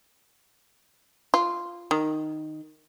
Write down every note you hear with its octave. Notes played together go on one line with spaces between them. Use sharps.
F4
D#3